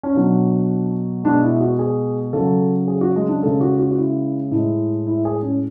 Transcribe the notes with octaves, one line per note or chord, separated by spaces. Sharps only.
C#4
B2 F#3 D4
B2 G#3 D4
E4
F#4
G#4
C#3 A4
F#3
G#4
F#4
G#3
D4
C#3 G#3 A4
F#4
F#4
F#4
E4
A2 G#3 E4
E4
G#4
C#4